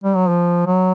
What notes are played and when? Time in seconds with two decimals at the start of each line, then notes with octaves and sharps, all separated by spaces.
0.04 G3
0.16 F#3
0.29 F3
0.66 F#3